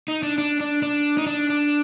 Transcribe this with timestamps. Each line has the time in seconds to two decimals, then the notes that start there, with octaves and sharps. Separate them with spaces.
0.08 D#4
0.23 D4
0.38 D4
0.60 D4
0.83 D4
1.18 D#4
1.27 D4
1.50 D4